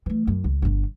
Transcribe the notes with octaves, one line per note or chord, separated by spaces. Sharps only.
E3 A3
F#2
C#2
G1 D3